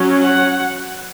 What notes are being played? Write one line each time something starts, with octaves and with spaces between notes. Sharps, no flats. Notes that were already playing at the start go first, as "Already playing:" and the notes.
Already playing: F#3 C#4
F#5